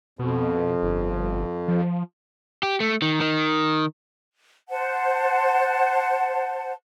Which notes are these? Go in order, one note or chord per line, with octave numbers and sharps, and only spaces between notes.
F2 B2
G1
F3
G4
A3
D#3
D#3
C5 F#5 A5